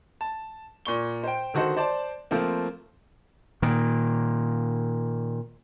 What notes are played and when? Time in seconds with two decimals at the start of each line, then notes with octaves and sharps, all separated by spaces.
0.21 A5
0.85 A#2 C#6 G7
1.24 C5 G5
1.54 D3 D#3 F#4 A4 C5
1.77 C5 D5 A5
2.31 F3 A3 A#3 C4
3.62 A#2 D#3